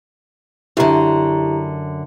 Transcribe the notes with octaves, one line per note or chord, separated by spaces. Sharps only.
F#2 D3 E4 G4 A#5